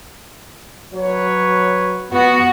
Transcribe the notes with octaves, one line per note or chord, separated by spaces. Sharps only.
F#3 B4 C#5
B3 F#4